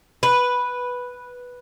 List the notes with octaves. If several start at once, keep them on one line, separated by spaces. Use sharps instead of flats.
B4